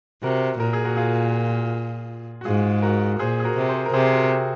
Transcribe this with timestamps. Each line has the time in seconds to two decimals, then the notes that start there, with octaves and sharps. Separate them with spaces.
0.23 C3 F#4 A#4
0.60 A#2 A#4
0.73 G#4
0.84 F#4 A#4
0.97 F4 G#4
2.41 F#4
2.45 G#2 F4 G#4
2.82 F#4 A#4
3.19 A#2 G#4 C5
3.40 G#4
3.44 F#4 A#4
3.57 C3
3.69 G#4 C5
3.86 A#4
3.94 C3 G#4 C5
4.06 G#4
4.13 F#4 A#4
4.31 C4